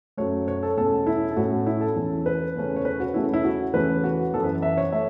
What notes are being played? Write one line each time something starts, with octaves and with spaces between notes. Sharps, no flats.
F#2 F#3 A3 C#5
C#5
A4
E2 B2 A3 C#4 A4
E4
A4
A2 A3 C#4 F#4
E4
A4
E2 E3 C#4
B4
E2 C#3 A3 C#4
C#5
B4
F#4
E2 C#3 A3 C#4 E4
E4
F#4
E2 C#3 E3 A3 C#4 B4
F#4
F#2 E3 B3 A4
B4
E5
C#5
A3 E5